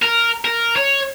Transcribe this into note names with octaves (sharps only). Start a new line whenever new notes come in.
A#4
A#4
C#5